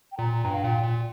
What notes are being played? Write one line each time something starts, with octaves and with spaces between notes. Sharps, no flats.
G5
A#2 A#5
G2 G5
F5
A#2 G5
A#2